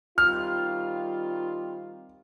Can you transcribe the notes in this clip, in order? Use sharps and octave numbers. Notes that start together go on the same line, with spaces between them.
D#3 G3 C4 F4 F6